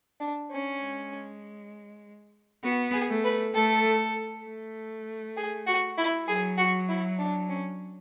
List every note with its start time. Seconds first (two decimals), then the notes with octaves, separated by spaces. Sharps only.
0.20 D4
0.51 C#4
0.81 G#3
2.63 B3 F#4
2.94 G#4
3.09 A3
3.24 B4
3.54 A3 A4
4.45 A3
5.37 G#4
5.67 F#4
5.98 E4
6.28 F#3 G#4
6.58 F#4
6.89 E4
7.19 D4
7.49 C#4